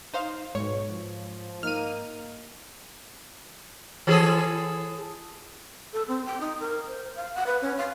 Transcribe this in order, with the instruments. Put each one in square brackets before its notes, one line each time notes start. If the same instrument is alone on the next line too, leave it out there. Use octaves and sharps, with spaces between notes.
[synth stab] D#4 C5 F5
[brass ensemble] B1 [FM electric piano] G#2 [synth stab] C#5
[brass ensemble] F3
[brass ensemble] A#3 D#4 [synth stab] F6 D#7
[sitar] E3 G#4 A4
[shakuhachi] A4
C4
G5
D#4
A#4
C5
F5
F#5
B4
C#4
F5